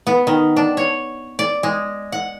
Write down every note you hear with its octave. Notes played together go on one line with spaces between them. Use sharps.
B3
D#3
D4
C#5
D5
G#3
F#5